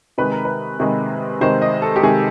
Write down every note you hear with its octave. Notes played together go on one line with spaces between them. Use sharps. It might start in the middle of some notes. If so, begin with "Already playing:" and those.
C3 D#3 G#3 B4
A#4
B4
C3 D#3 G#3
C3 D#3 G#3 C5
D#5
A4
G4
C3 D#3 G#3 G#4